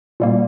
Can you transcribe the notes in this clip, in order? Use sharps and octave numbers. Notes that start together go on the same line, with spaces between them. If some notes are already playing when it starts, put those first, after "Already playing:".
A#2 G3 A#3